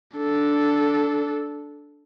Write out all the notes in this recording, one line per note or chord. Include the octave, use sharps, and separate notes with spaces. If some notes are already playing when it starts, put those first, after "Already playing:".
D4 A4